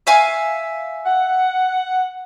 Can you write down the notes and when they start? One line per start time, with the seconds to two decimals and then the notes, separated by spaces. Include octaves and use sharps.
0.07 E5 F5 G#5
1.05 F#5